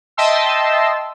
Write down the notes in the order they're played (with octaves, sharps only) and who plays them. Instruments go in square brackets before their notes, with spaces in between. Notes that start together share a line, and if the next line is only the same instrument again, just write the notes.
[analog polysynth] D#5 E5 G5 A5 C6 E6